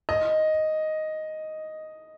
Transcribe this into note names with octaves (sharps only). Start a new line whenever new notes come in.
D#5